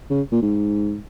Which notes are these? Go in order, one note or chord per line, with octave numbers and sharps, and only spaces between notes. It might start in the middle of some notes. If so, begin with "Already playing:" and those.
C#3
A#2
G#2